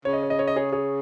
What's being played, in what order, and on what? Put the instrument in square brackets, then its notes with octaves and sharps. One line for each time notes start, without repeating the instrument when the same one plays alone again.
[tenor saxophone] C#3 [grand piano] C#5
[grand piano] D#5
C#5
D#5
C#5
D#5
G#4 C#5
G#4 C#5